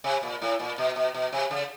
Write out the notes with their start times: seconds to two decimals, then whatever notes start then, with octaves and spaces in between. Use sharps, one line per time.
0.04 C3
0.23 A#2
0.42 A2
0.60 A#2
0.78 B2
0.96 B2
1.14 B2
1.32 C3
1.51 C#3